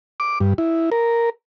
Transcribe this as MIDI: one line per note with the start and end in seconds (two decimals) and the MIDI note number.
0.20 0.39 86
0.40 0.53 43
0.58 0.90 64
0.92 1.30 70